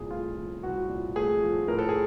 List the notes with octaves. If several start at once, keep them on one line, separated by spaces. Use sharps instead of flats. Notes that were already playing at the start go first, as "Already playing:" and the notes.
Already playing: C2 A#2 G#4
A3 F4
F3
C2 F#4
A#2
A3 G#4
F3
A2 A#4
A4
G#4